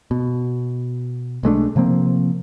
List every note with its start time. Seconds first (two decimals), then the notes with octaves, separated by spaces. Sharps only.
0.11 B2
1.43 B1 G#3 A3 D4
1.76 C3 F3 A#3 C4